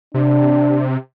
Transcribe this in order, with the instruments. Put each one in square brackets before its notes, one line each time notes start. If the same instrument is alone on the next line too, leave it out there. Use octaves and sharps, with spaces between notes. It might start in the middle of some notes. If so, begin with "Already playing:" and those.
[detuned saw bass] C3 [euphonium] D4